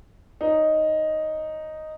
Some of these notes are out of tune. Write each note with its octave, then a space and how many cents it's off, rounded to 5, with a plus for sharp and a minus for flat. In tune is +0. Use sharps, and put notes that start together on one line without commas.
D#4 +0 C#5 +0